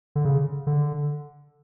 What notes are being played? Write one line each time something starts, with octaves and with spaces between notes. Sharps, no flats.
D3
C#3
D3